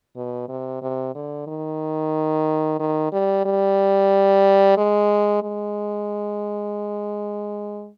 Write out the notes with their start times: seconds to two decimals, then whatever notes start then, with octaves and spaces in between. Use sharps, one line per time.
0.16 B2
0.49 C3
0.82 C3
1.15 D3
1.47 D#3
2.80 D#3
3.12 G3
3.45 G3
4.77 G#3
5.43 G#3